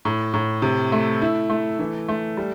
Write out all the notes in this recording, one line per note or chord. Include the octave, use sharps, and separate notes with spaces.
A2
A2
C3
A3
E4
A3
E3
A3
G3